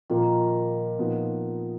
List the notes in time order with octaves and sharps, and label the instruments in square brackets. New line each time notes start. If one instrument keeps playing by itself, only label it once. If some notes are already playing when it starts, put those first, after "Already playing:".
[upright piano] A#2 F3 A#3 [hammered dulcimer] D#3
[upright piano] A#2 F3 B3 D#4